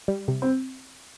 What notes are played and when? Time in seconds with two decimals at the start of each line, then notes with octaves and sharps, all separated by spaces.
0.08 G3
0.28 C3
0.42 C4